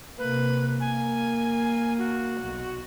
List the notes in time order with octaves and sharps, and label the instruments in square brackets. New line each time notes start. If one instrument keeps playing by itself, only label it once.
[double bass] C3 A#3 [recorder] B4
[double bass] A#3 [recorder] G#5
[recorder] F#4
[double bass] B1